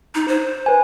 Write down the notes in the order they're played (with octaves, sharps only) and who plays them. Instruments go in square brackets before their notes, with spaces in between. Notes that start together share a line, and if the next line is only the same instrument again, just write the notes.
[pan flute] D#4
C5
[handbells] B4 G#5